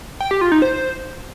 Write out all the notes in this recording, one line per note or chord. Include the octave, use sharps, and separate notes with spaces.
G5
G4
F4
D#4
C5